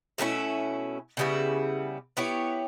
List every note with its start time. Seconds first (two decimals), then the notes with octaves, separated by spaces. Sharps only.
0.18 B2 A3 C#4 E4
1.17 C#3 G3 B3 E4
2.17 B3 E4 G4 C#5